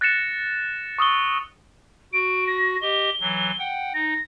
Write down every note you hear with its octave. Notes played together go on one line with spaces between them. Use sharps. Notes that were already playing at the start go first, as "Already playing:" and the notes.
F#6 A6 A#6 C#7 E7
C#6 D#6 E6 G7
F#4 D7
A#6
G4 D#5 G7
E3 F#3
F#5 G5
D#4 A#6